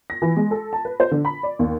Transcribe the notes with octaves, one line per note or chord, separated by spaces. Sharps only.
A#6
E3
G#3
A4
A5
B4
C5
D3
B5
D5
D#2